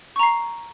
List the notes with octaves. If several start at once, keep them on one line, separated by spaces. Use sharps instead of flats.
A#5 C#6 C7